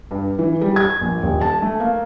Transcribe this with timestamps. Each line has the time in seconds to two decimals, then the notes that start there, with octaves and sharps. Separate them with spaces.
0.11 G2
0.39 E3
0.61 G3
0.76 G#6
1.01 A#1
1.23 D#1
1.41 A5
1.62 A3
1.80 A#3